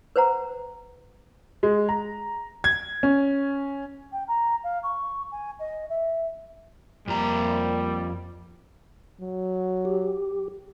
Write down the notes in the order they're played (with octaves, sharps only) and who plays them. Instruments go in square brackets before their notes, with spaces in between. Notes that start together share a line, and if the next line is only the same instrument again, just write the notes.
[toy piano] B4 C5 F#5 A#5
[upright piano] G#3
A#5
G#6
C#4
[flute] G5
A#5
F5
C#6
G#5
D#5
E5
[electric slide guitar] F2 A#5 [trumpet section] G3 [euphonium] A#3
[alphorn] F#3
[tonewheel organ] G4